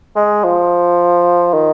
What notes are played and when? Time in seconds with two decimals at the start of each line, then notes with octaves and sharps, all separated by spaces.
0.16 G#3
0.44 F3
1.54 D#3